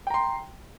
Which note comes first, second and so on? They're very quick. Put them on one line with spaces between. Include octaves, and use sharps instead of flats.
G5 A#5 C6